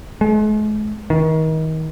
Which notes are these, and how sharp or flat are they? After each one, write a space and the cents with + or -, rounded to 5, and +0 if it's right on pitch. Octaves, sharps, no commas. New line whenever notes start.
G#3 +45
D#3 +30